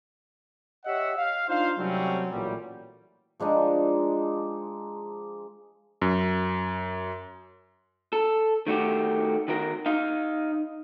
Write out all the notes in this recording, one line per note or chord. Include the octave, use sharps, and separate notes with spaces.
G4 C#5 D#5 E5 F#5
F5
D4 D#4 F4 C5 F5
C3 F#3 G3 A3 C4 C#4
A1 A#2 F#3 G3
F3 G#3 D4 D#4
F#2
A4
D#3 A3 F#4 G4
D#3 F#4 A#4
D#4 F5